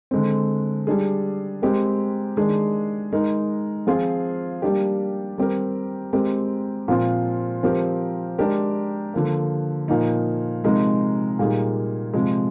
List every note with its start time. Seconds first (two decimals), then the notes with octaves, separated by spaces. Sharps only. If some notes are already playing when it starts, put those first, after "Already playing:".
0.11 D3 G#3 C4
0.87 G3 D4 G#4
1.62 G#3 C4 G4 A#4
2.37 D#3 G#3 D4 G#4
3.13 G#3 D#4 A#4
3.87 F3 C4 F4 G#4
4.62 G3 A#3 D4 G4
5.38 G3 C4 G4 A#4
6.13 G#3 C4 G4 A#4
6.88 A#2 F3 C4 F4
7.63 F3 C4 G4 A#4
8.38 G#3 D4 G4 A#4
9.14 D3 F3 A#3
9.88 A#2 F3 A#3 D#4
10.64 C3 F3 G#3 D#4 A#4
11.39 A#2 G3 A#3 D#4 G#4
12.14 C3 F3 G#3